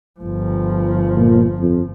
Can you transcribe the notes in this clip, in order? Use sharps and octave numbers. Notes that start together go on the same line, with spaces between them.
G1 F3
A#2
F2